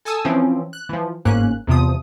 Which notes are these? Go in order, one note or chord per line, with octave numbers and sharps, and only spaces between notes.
A4 G#5 A5 D#6 E6
E3 F3 C4 C#4
F#6
E3 F3
G1 G#2 A#3 C#4 F#6
E2 C3 F3 D#6